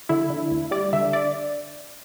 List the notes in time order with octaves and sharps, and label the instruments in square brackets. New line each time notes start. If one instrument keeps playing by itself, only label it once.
[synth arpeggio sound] D3 E4
D3
D2
G3 D5
D3 E5
D5